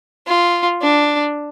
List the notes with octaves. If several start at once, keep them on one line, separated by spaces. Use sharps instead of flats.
F4
D4